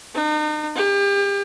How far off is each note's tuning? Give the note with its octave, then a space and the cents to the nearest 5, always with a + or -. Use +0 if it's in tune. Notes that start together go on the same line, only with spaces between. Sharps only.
D#4 -40
G4 +35